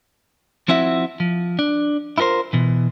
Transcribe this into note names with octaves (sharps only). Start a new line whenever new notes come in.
F3 C4 E4 F#4 E5
F3
D4
E4 F4 A4 A#4 C5
B2 E3